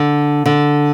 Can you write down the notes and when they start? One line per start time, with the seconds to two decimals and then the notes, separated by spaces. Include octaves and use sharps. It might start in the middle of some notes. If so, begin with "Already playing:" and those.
Already playing: D3
0.46 D3